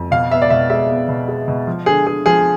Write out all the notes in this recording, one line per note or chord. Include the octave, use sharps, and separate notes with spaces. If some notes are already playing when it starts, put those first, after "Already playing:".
Already playing: F2
B2 F5
B3 E5
D5
B2 E5
G#3 E5
B3
B2
G#3
B2
F3
D3 G#4
D3 G#4
F3 G#4